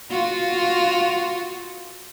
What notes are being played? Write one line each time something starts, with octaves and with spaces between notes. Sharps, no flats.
F4 F#4